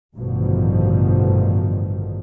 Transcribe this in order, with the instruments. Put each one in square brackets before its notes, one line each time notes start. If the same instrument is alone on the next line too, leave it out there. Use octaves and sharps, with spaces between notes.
[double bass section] A1 G2 B2 D3 D#3 F3